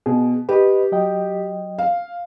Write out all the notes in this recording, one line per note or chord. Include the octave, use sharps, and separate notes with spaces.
B2 G#4
G4 B4 D#5
F#3 D#5 G5
F5